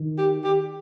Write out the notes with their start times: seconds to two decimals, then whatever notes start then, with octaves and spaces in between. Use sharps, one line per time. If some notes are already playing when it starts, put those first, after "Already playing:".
Already playing: D#3
0.18 G4
0.44 G4